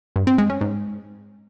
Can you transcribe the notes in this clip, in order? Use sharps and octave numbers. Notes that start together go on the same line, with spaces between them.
G2
C4
G#3
C#4
G#2